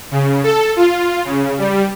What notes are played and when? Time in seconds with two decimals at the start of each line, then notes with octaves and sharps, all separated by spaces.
0.11 C#3
0.44 A4
0.76 F4
1.25 C#3
1.58 G3